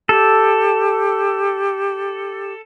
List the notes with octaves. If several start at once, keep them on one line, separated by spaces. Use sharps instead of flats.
G4 A4